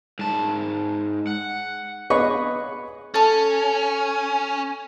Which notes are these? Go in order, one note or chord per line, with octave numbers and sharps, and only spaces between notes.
G#2 A5
F#5
G#4 B4 C#5 D#5 C#6
C#4 A4 A5